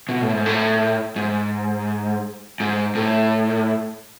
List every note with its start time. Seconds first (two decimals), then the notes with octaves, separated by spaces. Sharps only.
0.09 B2
0.21 A2
0.33 G#2
0.46 A2
1.16 G#2
2.60 G#2
2.95 A2